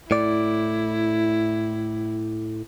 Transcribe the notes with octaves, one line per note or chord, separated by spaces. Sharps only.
A2 E4 D5